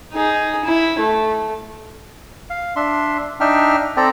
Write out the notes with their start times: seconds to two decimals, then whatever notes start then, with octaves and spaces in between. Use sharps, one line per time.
0.13 D#4 G#4
0.64 E4
1.00 A3
2.50 F5
2.76 D4 E5 C6
3.40 D4 D#4 E5 G5 F6
3.97 C4 A4 D5 G5 A#5